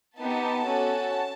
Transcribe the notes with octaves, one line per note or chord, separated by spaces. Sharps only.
B3 D#4 G4 A5
C#4 F#4 A4